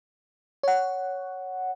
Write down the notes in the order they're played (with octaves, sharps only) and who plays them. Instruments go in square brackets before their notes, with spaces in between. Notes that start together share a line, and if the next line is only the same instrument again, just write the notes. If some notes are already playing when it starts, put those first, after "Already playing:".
[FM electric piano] C#5 F#5